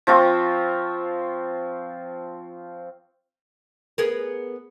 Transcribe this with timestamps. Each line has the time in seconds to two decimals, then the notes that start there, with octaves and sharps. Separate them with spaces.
0.07 F3 C4 F4 C#6
3.98 B3 G#4 A#4